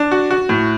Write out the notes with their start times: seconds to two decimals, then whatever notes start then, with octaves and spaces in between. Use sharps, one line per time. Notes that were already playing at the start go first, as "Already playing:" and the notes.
Already playing: D4
0.12 F#4
0.31 F#4
0.49 A2